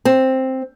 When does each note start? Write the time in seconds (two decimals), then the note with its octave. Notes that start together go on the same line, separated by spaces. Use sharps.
0.05 C4